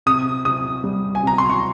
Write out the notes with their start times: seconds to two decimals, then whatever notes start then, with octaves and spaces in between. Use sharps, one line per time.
0.06 C3 D#6
0.45 C3 D#6
0.84 G3
1.15 G#5
1.23 C3 A#5
1.38 C6
1.50 C#6